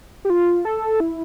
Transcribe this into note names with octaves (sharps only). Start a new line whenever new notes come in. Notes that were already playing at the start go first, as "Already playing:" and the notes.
G4
F4
A4
E4